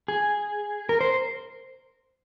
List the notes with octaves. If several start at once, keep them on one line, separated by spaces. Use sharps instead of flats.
G#4
A#4
C5